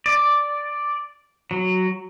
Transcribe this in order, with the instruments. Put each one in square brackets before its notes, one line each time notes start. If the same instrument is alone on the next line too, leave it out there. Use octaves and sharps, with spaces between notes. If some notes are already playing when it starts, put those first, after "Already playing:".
[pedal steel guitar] D5
F#3